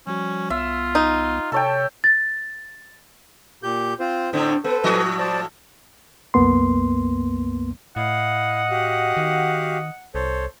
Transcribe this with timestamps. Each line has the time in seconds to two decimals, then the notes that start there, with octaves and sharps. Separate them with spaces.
0.07 F3 G3 C#4 F#4
0.50 C2 B3 F4 E5
0.95 D#4
1.52 C3 A4 C#5 G5 A5
2.04 A6
3.63 A#2 G4 G6
4.00 C4 F4 C5
4.33 A2 D3 C4 D4 C5
4.64 B3 A4 B4 C5
4.84 A2 F3 D#5
5.19 C5 D5 A5
6.34 C2 F#2 A#3 B3 C6
7.96 A2 E4 D#5 F5 F#5
8.70 F#4 G4 F5
9.17 D#3
10.15 C2 A4 C5 C#5